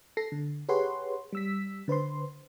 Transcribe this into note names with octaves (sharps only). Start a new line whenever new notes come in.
A4 A#6 C7
D3
G4 G#4 B4 C#5 F#5 C6
G3 E6 B6
D3 B4 C5 C6